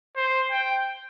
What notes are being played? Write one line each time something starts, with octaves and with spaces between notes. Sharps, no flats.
C5
G5